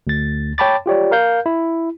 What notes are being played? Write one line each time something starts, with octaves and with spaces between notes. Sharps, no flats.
D2 A6
C#5 G5 A5 B5 D6 A6
F4 G4 C#5 D5
A#4 F5 G6
E4